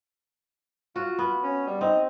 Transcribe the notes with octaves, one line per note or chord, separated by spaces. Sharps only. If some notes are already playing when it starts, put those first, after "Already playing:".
F4 F#4
B3
C#4
G3
C4 D#4